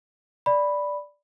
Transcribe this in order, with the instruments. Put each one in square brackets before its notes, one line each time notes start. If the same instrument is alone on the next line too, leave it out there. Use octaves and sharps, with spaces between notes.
[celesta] D5 B5